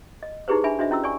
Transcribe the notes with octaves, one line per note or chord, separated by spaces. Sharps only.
D#5
D#4 E4 G4 G#4 B4 C5
D4 E5 G#5 B5
D4 F#4 C5 D#5 E5
C#4 E4 F#4 E6
D5 G#5 C#6